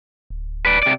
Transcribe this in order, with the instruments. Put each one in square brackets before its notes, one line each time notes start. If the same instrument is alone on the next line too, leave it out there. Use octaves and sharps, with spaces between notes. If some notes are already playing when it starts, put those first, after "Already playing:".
[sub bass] D1
[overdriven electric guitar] B4 D5
C3 D5